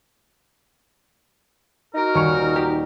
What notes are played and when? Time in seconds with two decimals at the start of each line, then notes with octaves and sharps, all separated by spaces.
1.95 D#4 F#4 A#4
2.15 D#1 C#6 F6
2.56 G4